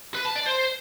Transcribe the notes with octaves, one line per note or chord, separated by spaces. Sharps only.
B4
A5
D5
C5